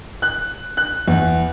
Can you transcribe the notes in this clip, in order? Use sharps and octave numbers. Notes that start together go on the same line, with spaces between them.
F#6
F#6
E2